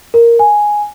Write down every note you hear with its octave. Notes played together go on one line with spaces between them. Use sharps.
A#4
G#5